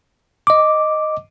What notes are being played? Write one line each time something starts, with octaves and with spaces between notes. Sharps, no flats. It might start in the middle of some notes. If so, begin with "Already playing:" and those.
D#5 D6